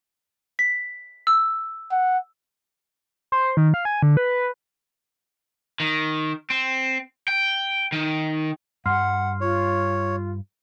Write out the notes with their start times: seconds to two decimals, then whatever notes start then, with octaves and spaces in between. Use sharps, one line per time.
0.59 B6
1.27 E6
1.91 F#5
3.32 C5
3.57 D#3
3.74 F5
3.85 G#5
4.03 D3
4.17 B4
5.80 D#3
6.50 C4
7.28 G5
7.92 D#3
8.86 G2 G3 F#5 C6 F6 C7
9.41 F4 C#5